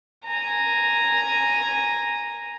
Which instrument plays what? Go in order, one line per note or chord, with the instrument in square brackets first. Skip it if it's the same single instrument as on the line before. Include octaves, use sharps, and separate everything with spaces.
[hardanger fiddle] G#5 A#5